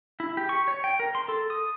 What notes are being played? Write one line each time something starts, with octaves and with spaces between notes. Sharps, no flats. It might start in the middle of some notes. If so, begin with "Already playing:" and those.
E4
G4
C#6
C#5
G5
A#4
C6
A4
D#6